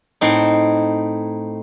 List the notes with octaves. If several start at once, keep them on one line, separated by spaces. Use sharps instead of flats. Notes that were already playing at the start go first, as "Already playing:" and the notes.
A2 C4 D#4